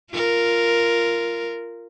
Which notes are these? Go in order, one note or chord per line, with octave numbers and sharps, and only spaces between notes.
F4 A#4